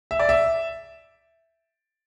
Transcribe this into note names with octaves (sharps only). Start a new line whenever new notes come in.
E5
D5
E5